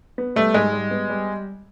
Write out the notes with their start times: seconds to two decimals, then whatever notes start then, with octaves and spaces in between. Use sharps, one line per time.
0.18 B3
0.36 G3 A3
0.54 G#2 G#3
0.73 G3
0.91 B3
1.09 G3